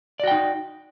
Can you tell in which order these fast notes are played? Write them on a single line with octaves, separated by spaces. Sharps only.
D5 F#4 G5 D#4